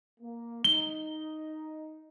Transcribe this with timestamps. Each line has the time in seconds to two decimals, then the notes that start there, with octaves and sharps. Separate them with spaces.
0.20 A#3
0.64 D#4 G7